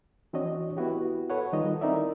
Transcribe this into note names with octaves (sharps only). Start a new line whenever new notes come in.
E3 C4 D4 F#4 C#5 D#5
B3 E4 F#4 G4
A4 B4 C#5 F#5
D#3 G3 D#4 F4 A4 D#5
C4 D#4 E4 A#4 D5 E5